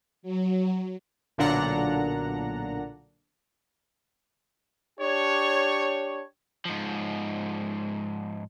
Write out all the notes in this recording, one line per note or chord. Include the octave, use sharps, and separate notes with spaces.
F#3
B1 A#2 D3 D4 F#5 A#5
D4 G4 C#5
G#2 F3